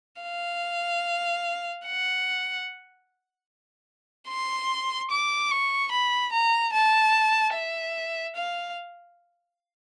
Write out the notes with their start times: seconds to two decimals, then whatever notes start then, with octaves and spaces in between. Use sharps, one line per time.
0.22 F5
1.85 F#5
4.28 C6
5.11 D6
5.51 C#6
5.92 B5
6.32 A#5
6.73 A5
7.53 E5
8.36 F5